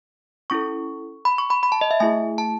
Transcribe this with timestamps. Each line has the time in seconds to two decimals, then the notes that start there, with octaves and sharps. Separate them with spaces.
0.50 C#4 E4 A4 C#6
1.25 B5
1.38 C#6
1.50 B5
1.63 B5
1.72 A5
1.81 D#5
1.91 E5
2.00 A3 E4 G#4 G#5
2.38 A5